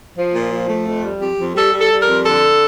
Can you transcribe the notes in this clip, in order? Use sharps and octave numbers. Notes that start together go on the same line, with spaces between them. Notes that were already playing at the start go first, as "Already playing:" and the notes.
F3
A#2
F3
A3
F2
G3
F2 G4
F2
G3 A4
G3
A4
G3
F2 A#4
D3 A4